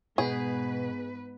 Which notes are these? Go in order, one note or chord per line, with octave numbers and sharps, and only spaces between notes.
G#2 B2 G#4 B4